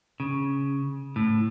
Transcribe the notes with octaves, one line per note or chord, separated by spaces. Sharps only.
C#3
A2